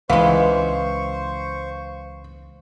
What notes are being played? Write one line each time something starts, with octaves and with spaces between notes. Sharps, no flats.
C#2 E3 G#3 C5 F5 C#6